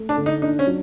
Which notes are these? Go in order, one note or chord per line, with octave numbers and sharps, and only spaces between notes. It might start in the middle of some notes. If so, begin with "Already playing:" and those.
Already playing: A3
D4
D3
D#4
D4 D#4
C#4
F#3